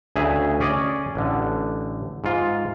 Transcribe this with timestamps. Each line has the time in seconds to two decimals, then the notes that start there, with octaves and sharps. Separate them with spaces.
0.16 D2 C#3 G#4 E5
0.60 C#4 G#4 D5 D#5
1.15 A1 D3
2.24 G#2 F4